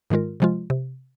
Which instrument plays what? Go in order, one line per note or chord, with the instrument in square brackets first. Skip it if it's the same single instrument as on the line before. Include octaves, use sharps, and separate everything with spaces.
[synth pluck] G#2 D#3 G#3 F4 A#4
C3 F3 G#3 F4
C3